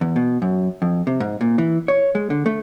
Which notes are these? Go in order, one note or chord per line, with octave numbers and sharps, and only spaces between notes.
E2
B2
F#2
F2
C3
G#2
A#2
E3
C#5
G#3
D3
A3